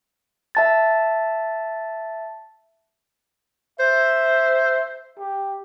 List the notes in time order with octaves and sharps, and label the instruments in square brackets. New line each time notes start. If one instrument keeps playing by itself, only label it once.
[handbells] E5 A5 A6
[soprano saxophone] C5 [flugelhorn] E5
[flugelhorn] G4